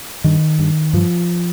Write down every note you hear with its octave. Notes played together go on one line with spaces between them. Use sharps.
G2 D#3
G2
G2 F3